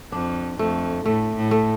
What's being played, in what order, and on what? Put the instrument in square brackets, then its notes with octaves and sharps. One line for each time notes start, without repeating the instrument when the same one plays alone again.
[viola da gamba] F2 [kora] D4
[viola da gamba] F2 [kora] A3
[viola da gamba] A2 [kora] A3
[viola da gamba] A2
[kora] A3